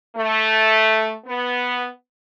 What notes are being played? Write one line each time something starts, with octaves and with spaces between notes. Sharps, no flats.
A3
B3